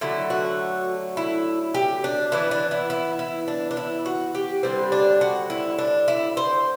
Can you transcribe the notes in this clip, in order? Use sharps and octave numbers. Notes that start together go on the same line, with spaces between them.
D3 F#3 A3 E4
F#4
E4
G4
D4
E3 B3 D4 E4
D4
E4
E4
E4
D4
D4
E4
F#4
G4
D3 G3 C4 C5
D4
F#4
E4
D4
E4
C5